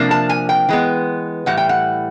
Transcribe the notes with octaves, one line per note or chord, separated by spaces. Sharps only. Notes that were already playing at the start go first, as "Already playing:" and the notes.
Already playing: C3 F3 A#3 D4
A5
G#5
G5
E3 G#3 B3
A2 E3 G3 F#5
G5
F#5